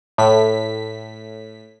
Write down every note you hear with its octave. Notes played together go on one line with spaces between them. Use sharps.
A2 B6